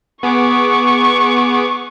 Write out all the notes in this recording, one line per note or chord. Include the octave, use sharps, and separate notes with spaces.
B3 G#4 C#6 D6